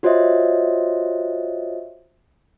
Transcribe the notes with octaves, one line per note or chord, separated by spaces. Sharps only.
F4 F#4 C5 C#5 D#5 E5